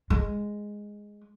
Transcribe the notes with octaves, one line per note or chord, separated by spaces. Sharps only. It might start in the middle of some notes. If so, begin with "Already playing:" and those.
G#3